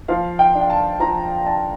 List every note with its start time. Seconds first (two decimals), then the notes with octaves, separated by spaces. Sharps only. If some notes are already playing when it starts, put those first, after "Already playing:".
0.08 F3 F5
0.39 G5
0.55 D4
0.61 G5
0.70 A5
1.00 F3 A#5
1.46 D4 A5